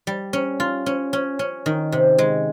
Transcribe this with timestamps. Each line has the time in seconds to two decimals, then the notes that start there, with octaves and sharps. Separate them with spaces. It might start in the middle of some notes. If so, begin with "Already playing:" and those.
0.07 G3
0.33 C#4
0.60 F4
0.86 C#4
1.13 C#4
1.39 C#4
1.66 D#3
1.92 C3
2.18 G#3